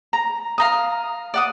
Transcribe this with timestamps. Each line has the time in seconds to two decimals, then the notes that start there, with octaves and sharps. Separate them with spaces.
0.13 A#5
0.58 F5 A#5 D#6
1.34 D5 F#5 D#6